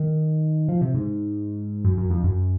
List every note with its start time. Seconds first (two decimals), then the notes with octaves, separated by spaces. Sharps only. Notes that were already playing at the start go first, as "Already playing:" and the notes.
Already playing: D#3
0.69 F3
0.81 C3
0.94 G#2
1.84 F#2
1.97 F#2
2.10 F2
2.24 F#2